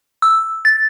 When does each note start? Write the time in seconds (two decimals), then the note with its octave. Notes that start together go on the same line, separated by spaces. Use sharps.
0.22 E6
0.65 A6